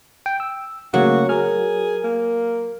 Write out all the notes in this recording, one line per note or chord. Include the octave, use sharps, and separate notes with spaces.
G5
E6
C#3 F#3 A3 A#3 F#4
G#4 A#4 F6
A#3